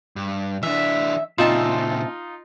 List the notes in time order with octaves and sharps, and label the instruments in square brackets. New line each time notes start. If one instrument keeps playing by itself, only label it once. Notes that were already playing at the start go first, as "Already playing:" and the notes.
[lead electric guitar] G2
[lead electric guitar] E3 D4 [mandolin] E5
[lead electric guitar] A#2 C#3 [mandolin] C4 E5 A5 [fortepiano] D#4 F4